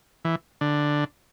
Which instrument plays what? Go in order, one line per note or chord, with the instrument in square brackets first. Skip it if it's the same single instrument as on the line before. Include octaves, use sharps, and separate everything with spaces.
[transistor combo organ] E3
D3